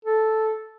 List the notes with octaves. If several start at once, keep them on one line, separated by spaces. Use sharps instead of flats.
A4